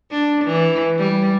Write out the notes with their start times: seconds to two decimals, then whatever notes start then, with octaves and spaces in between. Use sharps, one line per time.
0.11 D4
0.45 E3
0.98 G3